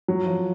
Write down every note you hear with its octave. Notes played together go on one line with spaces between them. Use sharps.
F#3
F3